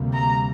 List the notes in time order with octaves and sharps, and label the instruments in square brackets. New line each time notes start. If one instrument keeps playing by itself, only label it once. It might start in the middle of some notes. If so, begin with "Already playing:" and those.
Already playing: [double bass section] D2 C3 G3 A#3
[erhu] A#5